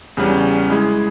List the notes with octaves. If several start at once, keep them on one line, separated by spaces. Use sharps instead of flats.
E2 C#3 G3 C#4
G#3 E4 G#4